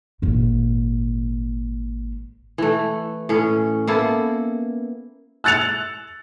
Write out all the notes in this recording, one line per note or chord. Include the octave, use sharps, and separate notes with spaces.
G#1 A#2
E3 A3
A2 C#4
A#3 B3 E4 A4
E6 F#6 A6 C#7 F7